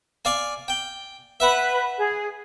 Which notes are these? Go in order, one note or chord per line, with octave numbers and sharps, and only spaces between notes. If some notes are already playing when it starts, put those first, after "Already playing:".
D5 F5 G#5
G5
B4 E5 F#5
G#4